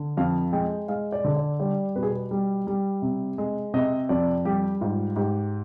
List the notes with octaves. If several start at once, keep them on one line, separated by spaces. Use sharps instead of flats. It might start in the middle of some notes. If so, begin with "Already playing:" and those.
Already playing: D3
F2 F5
G#3 G5
G#3 F5
D5
D3
D5
G3 D5
B2 B4
G#4
B4
G3
G3
C3
G#3
C3 D#5
F2 D5
G3 G4
G#2 F4
G#2 G4